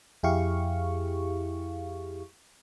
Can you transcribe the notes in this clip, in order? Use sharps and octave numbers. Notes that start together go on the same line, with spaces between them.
F2 E4 G4 G#4 F5 C#6